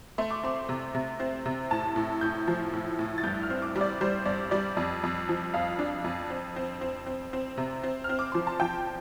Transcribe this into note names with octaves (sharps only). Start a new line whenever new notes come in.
A3 C6
D6
C4 C6
C3
C3
C4
C3
A2 A5
A2
A2 G6
F3
A2
A2
A6
G2 G6
F6
C4
D6
G3
D5
G3 C5
G2 D5
G3 D5
F2
F2
F3
F2 F5
D4
F2
C4
C4
C4
C4
C4
C3
C4
C4 F6
D6
F3 C6
A5
F3 G5